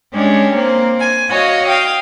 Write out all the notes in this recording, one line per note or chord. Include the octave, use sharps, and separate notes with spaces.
G#3 C#4 D4 G4 C#5
A#3 C4
G#5
F#4 C#5 D#5 F5
F5 G5 D#6